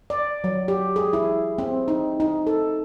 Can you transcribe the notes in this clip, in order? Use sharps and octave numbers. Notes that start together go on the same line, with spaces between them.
D5
F#3
G4
G#4
E4
C4
D#4
D#4
A4